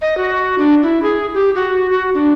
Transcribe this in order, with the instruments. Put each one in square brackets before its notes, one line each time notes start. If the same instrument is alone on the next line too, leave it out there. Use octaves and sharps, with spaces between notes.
[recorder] D#5
F#4
D4
E4
G#4
G4
F#4
F#4
D4